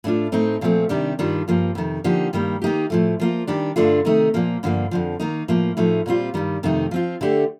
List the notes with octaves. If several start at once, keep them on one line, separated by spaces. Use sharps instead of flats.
A2 A3 D4 F4
A2 A3 C4 D#4
A#2 F3 A3 C4
C3 D#3 G3 D4 G4
G2 D#3 G3 D4 F4
G2 F3 A#3
F2 C3 D#3
D3 F3 A#3 D#4 G4
G2 D#3 G3 A#3
D#3 A#3 D#4 G4
A2 F3 A3
F3 A#3 F4
D#3 G3 D4 G4
G2 D3 A3 D4 F4
C3 D#3 A3 D#4
A#2 F3 A#3
G2 D3 F3 A#3
F2 D3 F3
D#3 A#3 D#4
A2 F3 A#3
A2 F3 A3 D#4
A#2 G3 C4 F4
G2 D#3 G3
F2 C3 D#3 A3 D#4
F3 C4 F4
D3 A3 D4 G4